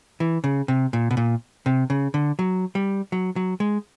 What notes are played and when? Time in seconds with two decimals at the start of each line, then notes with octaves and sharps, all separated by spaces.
0.20 E3
0.44 C#3
0.68 C3
0.93 A#2
1.11 B2
1.17 A#2
1.66 C3
1.90 C#3
2.14 D3
2.39 F#3
2.75 G3
3.12 F#3
3.36 F#3
3.60 G#3